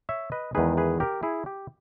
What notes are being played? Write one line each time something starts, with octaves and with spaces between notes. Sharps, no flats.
C#5 E5
B4 D#5
E2 D#3 G#3 D#4 G#4 B4
G#4 B4
G4 A#4
E4 G#4
G4